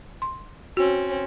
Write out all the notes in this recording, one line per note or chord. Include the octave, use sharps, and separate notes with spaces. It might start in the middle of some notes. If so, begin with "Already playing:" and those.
C6
C4 C#4 F#4